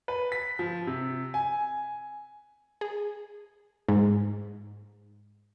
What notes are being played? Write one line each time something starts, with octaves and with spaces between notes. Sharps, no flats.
B4
B6
F3
C3
G#5
G#4
G#2